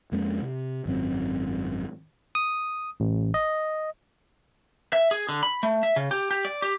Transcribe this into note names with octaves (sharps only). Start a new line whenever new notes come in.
F2 G#3 A#3 C#4
C3
G#1 F#2 C4
D#6
A1
D#5
E5
G#4
D3
B5
A3
E5
C#3
G4
G4
D5
G4